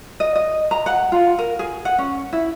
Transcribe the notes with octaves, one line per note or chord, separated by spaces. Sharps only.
D#5
D#5
A#5
F#5
F4
A#4
G#4
F#5
C#4
E4